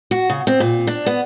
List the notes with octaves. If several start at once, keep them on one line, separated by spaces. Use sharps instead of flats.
F#4
C#3
C4
A#2
D4
B3